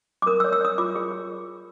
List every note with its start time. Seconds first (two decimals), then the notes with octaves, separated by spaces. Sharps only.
0.22 D6
0.27 A#4 D#6
0.40 E6
0.44 C#5
0.52 E6
0.61 C#5 D#6
0.78 F4 D6
0.96 G#4
1.12 G#4